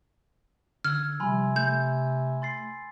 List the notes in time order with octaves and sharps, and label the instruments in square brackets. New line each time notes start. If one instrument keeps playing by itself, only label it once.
[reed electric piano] D3 [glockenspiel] E6 G#6 [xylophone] F6
[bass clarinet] C3 [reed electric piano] F3 G3 [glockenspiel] G#5 B5 C6
[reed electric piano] A3 [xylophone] G6
[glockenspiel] C6 A6 C7